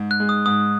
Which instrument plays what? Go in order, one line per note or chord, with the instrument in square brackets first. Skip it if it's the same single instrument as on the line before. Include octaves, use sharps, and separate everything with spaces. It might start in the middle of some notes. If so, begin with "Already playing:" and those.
Already playing: [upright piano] G#2
[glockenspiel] F#6
[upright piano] G#3
[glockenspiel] D#6
[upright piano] G#2 [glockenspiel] D#6